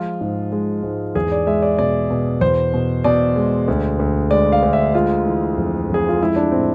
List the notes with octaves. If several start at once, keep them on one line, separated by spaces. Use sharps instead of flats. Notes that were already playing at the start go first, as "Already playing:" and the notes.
Already playing: F3 G#3 F4
G#2
G#3
G#2
E2 G#4
D5
G#3 E5
D5
B2 D5
B2
E2 C5
B2
B2 D5
G#3
D2
D2
G#3 D5
F5
D2
E5
G#3 F4
E3
F2
F2
G#4
F4
G#3 E4
D4
A2 C4